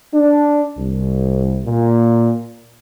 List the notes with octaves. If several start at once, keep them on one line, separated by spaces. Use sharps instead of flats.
D4
C2
A#2